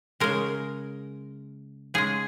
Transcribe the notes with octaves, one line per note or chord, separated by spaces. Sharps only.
C#3 G#3 A#4
C#3 G#3 G#4